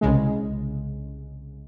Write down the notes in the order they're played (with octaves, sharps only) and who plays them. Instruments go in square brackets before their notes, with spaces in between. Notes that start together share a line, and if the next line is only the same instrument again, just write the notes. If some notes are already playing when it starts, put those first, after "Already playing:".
[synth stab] C2 C#3 G#3